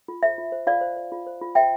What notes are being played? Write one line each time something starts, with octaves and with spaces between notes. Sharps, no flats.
F4
C5 E5
F4
C5
F4 D5 F5
C5
C5
F4
C5
F4
C5 E5 G5